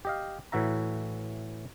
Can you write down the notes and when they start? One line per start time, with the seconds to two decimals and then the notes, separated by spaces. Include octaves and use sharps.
0.05 G4 D#5 F5
0.52 A2 E3 F#4 E5 A#5